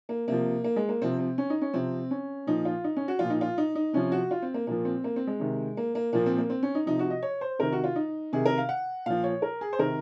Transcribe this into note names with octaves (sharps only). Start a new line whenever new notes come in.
A#3
C3 F3 A#3
A#3
G#3
A#3
C3 F3 C4
C4
C#4
D#4
C#4
C3 F3 C4
C#4
A#2 F3 D#4
F4
D#4
C#4
F#4
A#2 F3 F4
D#4
F4
D#4
D#4
C3 F3 C#4
F#4
F4
C4
A#3
A#2 F3 A#3
C4
A#3
C4
G#3
C3 D#3
A#3
A#3
A#2 F3 A#3
C4
A#3
C4
C#4
D#4
C3 F3 D#4
F#4
D#5
C#5
C5
C3 D#3 A#4
F#4
F4
D#4
C3 D#3 G#4
A#4
F5
F#5
A#2 F3 F5
C#5
A#4
G#4
C5
C3 D#3 A#4